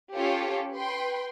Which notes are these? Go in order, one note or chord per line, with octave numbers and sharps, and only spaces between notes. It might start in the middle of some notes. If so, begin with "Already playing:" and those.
C#4 F4 G4 A4 C#5
B4 G5 C6